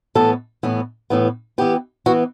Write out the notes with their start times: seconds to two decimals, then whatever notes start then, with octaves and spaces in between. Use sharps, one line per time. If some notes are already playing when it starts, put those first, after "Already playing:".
0.15 A2 E3 B3 A4
0.63 A2 E3 B3
1.10 A2 E3 B3
1.58 E3 B3 G4
2.06 E3 B3 F#4